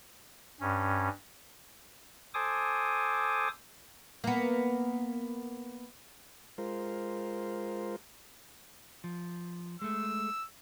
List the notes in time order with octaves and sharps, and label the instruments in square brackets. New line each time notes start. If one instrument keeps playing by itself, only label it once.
[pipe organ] G2 C#4
A4 C5 G#5 D6 D#6
[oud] A#3 B3
[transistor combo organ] G#3 F4 A#4 C5
[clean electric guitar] F3
[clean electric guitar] G#3 A3 [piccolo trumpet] E6